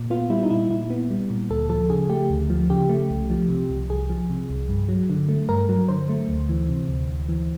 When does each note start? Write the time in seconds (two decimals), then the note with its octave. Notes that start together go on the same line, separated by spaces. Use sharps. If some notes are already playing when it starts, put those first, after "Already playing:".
Already playing: A#2
0.10 B3 F4
0.30 G3 E4
0.43 D#4
0.50 A#2 E4
0.70 A#2 E4
0.90 B3
1.10 G3
1.30 A#2
1.50 D2 A4
1.69 F3 A4
1.90 C#3 G#4
2.09 A3 G4
2.30 D2
2.50 F3
2.70 C#3 G4
2.89 A3
3.10 C2
3.30 F3
3.49 C3
3.70 C2
3.89 C2 G#4
4.10 F3
4.30 C3
4.50 C2
4.69 G2
4.89 F#3
5.10 D3
5.29 A3
5.49 G2 A#4
5.69 F#3
5.88 D3 C5
6.09 A3
6.29 D2
6.49 E3
6.69 C3
6.88 D2
7.09 D2
7.29 E3